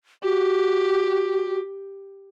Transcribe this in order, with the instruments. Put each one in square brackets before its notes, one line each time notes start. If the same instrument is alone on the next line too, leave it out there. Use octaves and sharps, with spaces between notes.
[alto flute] F#4 [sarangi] G4